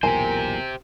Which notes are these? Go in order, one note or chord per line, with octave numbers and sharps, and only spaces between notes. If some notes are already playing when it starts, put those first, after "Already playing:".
B1 E2 A#2 G4 A#4 C5 G#5